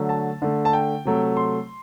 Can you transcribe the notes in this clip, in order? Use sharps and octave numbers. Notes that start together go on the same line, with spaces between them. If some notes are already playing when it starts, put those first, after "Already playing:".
Already playing: D3 F#3 A3
A5
D3 A3
A5
G5
C3 F#3 A3
C6